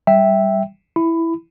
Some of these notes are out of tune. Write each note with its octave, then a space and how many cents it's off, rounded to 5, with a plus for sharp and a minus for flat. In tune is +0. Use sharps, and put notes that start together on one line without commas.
G3 +0 E5 +0 G5 +0
E4 +0 B5 +15